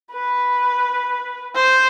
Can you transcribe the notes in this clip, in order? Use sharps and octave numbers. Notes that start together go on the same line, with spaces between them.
B4
C5